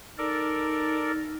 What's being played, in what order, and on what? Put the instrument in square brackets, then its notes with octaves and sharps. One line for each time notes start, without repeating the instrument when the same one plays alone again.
[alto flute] D#4 [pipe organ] A4 A#4 D5